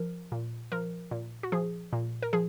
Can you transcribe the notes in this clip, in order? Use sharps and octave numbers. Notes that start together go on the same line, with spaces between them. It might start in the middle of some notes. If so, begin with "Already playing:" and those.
Already playing: F3 A#4
A#2
F3 A#4
A#2
F#4
F3 G#4
A#2
A#4
F3 G#4